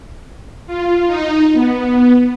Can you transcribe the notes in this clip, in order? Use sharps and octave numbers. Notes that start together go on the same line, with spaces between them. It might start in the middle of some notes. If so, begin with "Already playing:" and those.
F4
D#4
B3